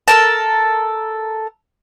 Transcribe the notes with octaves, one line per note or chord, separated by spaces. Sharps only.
A4 A#4 A5